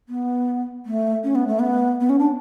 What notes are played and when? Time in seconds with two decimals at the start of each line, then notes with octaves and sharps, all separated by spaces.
0.09 B3
0.86 A3
1.24 C#4
1.35 B3
1.47 A3
1.59 B3
2.00 B3
2.09 C#4
2.19 D4